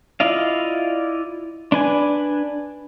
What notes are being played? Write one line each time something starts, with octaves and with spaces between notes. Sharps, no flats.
E4 F4 D5 D#5 F5
D4 B4 G#5